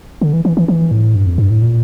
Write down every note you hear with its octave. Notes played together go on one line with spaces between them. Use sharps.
D3
E3
E3
E3
E3
A2
G2
F2
G2
A2
A#2